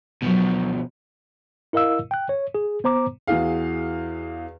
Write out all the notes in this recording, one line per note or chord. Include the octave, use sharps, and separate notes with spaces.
B2 F3 F#3 B3
E4 A#4 D#5 F5 E6
G5 F#6
C#5
G#4
B3 C5 A#5 D6
E2 E3 F#4 G#4 F5